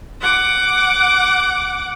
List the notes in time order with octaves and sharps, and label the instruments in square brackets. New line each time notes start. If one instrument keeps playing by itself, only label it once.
[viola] F#5 D6